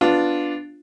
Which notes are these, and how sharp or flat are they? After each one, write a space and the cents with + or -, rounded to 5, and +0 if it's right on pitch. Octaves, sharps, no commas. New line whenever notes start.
B3 +0 D4 +0 F4 +0